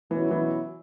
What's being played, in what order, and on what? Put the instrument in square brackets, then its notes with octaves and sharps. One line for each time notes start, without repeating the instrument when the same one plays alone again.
[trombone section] B2 F#3 C#4 E4 [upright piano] E3
[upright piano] E3